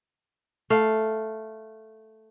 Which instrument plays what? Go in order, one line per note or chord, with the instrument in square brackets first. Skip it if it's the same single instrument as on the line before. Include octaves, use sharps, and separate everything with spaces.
[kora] A3 F5